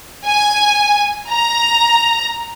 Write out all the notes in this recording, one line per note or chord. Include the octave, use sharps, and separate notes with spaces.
G#5
A#5